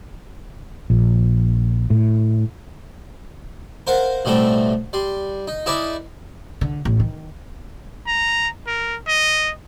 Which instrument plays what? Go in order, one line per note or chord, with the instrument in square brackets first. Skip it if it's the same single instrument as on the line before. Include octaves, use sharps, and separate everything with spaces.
[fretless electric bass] A#1
A2
[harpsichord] A#4 C5 F5 F#5
B1 A2 G3 A3 C4 E5
G3 C6
D#4
D#4 E4 G#4 B4 D5 E5
[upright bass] D3
A1
D#3
[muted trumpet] A#5
A#4
D#5